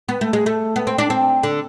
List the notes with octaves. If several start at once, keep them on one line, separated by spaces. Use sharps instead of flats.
B3
A3
G#3
A3
B3
C4
D4
C4
D3